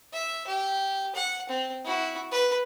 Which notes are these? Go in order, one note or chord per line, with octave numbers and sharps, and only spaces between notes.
E5
G4
F#5
C4
E4 F#4
B4